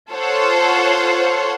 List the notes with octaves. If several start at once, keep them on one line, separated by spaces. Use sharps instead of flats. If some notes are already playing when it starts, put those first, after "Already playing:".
F4 A4 C5 C#5 F#5